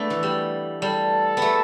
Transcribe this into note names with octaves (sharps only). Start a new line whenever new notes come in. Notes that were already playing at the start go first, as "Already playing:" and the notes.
Already playing: A3 B3 D4
E3
G3
G3 A4
A3 B3